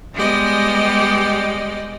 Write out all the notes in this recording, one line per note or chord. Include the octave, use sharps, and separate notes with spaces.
G3 G#3 B3 G4 D5 D#5